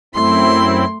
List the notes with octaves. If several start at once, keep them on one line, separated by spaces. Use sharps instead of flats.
F#2 A3 C4 E4 C6